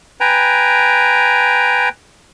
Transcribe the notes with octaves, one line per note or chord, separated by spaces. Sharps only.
B4 G5 G#5 A#5